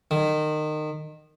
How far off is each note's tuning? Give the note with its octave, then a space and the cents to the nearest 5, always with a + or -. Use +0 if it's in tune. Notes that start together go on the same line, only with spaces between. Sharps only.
D#3 -25